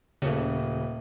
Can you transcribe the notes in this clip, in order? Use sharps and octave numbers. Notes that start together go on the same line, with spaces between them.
D#1 C#3 A3